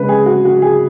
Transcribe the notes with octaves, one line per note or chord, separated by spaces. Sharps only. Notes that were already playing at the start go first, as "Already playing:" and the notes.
Already playing: C#3 G#3 B4
G#4
F#4
F#4
G#4